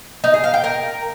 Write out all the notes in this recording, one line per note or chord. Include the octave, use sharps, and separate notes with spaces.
D#4
G#4
F5
G5
A#4